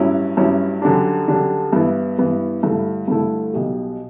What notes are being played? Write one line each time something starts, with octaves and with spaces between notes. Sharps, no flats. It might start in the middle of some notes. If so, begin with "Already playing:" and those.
Already playing: A1 G2 F#3 C#4 E4
A1 G2 F#3 C#4 E4
F#2 D3 G3 D4
F#2 D3 G3 D4
G2 E3 B3 E4
G2 E3 B3 E4
G2 D3 A3 E4
G2 D3 A3 E4
B1 B2 G3